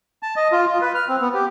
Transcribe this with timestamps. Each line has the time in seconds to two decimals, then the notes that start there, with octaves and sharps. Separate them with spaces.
0.23 A5
0.36 D#5
0.52 F4
0.67 F4
0.81 B4
0.95 F6
1.08 C4
1.21 B3
1.34 G4